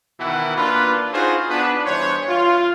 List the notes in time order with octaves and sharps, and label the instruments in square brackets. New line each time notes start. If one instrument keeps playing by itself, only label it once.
[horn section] B2 D#3 E3 E4 F#5
A#3 D4 F4 B4
D#4 F4 F#4 G#4 C5
B3 D4 B4
G2 E3 C5 C#5
F4